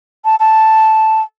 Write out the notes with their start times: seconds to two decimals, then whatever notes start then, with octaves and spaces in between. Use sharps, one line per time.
0.25 A5
0.40 A5